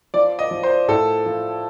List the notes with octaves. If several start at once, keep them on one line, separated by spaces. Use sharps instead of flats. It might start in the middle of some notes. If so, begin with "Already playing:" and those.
F3 D5
D#5
F3
C5
A2 A4
F3